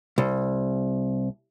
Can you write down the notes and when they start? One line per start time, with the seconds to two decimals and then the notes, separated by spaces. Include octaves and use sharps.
0.18 C2